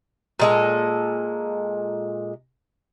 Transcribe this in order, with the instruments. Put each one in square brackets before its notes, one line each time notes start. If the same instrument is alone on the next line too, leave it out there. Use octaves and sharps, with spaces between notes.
[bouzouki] A#2 G#3 A4